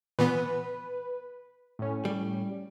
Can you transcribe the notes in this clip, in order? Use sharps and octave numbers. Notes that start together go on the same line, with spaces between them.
A#2 E3 B3 B4
A2 C#4
G3